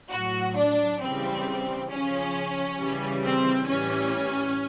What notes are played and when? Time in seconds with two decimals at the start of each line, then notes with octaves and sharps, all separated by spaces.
0.11 A2 F#3 F#4
0.56 D4
1.00 C#3 E3 G3 C4
1.89 C#3 F3 C#4
2.79 C#3 E3 G3
3.24 C4
3.68 A2 E3 G3 C#4